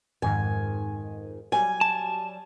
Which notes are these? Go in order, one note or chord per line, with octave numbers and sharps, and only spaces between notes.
F2 G#2 D#3 G#5
F#3 G3 G#5
A5